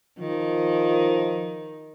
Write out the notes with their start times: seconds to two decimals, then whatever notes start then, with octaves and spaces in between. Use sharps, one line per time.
0.19 D#3 F3